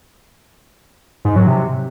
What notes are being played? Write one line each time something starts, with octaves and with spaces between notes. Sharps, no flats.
G#2
F#3
C3